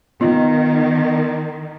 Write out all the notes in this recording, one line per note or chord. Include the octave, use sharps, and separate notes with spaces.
D#3 B3 F4 D#5